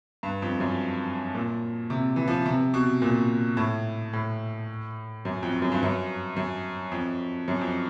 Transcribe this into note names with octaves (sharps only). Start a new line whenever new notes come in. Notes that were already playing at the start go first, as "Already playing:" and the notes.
G2
F2
F#2
A#2
C3
E3
F3
C3
B2
A#2
A2
A2
F#2
F2
F#2
G2
F#2
F#2
F2
F#2
F2